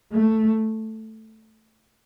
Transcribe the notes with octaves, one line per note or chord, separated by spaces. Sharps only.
A3